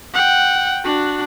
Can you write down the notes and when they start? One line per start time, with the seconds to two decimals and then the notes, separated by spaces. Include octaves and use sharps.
0.14 F#5 G5
0.84 D4 F#4